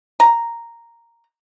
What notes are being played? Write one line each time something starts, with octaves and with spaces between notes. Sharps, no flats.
A#5